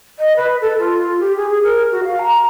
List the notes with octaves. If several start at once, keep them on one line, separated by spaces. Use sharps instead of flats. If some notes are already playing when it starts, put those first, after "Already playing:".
D#5
B4
A4
F4
F4
G4
G#4
A#4
F#4
F5
A#5